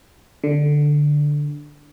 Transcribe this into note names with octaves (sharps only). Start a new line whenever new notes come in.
D3